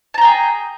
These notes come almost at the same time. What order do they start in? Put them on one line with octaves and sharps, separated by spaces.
A5 A#5 G5 G#4